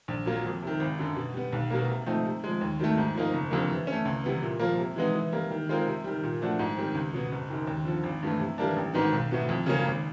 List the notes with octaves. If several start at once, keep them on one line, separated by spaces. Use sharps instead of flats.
A#1
A#2 F#3 A#3
F2
C3 D#3
G#1
F#2 D3
B2
G3 B3
B1
B2 F#3 A#3
C3
F3 A3 C4 D#4
C3
F3 G#3
D#2
D#3 F#3 A3
G#2
F3 A#3 D#4
F#1
F2 D3 G3 A#3
E3
C#4
A3
C#2
C3 E3 G3 B3
A#2
F3 A#3
C3
E3 G#3 B3 D#4
E3
G3 A#3
D#3
G#3 C4 F4 A#4
C3
D#3 G3
A#2
F3 A3 D4 F#4
G#2
D#3 G3 C4
C#2
B2 F#3 B3
F#1
F#2 D#3
D#2
D3 F3
G#1
G2 E3 A3
C3
E3 G3 A#3 D4
A1
G#2 D#3 F#3 B3
B1
A2 F#3 B3
F2
C#3 F#3 A#3 C#4
G#1